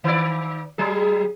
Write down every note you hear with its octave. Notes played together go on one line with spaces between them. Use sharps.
D#3 D5
F#3 G3 G#4